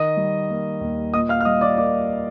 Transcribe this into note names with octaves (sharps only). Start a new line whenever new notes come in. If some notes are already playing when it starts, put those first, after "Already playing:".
Already playing: D#3 D#5 D#6
G3
A#3
D#2
A#2 D#5 D#6
F5 F6
F6
G3 D#5 D#6
D5 D6
A#3 D5 D6